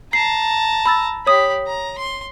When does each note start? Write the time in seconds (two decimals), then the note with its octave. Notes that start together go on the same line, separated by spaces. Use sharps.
0.13 A5 A#5 C7
0.86 B5 E6 A6
1.27 G4 C#5 B5 D#6
1.67 A#5
1.98 C6